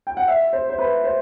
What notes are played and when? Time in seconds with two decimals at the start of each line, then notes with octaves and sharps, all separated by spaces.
0.07 G5
0.17 F#5
0.28 E5
0.53 C5
0.69 C5
0.79 B4
1.04 C5